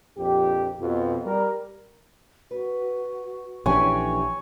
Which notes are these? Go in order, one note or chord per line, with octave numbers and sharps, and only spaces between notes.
A#1 F2 G4
F2 B2
G3 A#4
F#4 B4
A#1 E3 C#4 D4 G4 A4 C#5 G#5